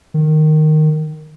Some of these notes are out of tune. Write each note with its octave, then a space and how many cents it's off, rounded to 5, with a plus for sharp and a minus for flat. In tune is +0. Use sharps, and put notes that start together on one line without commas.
D#3 -10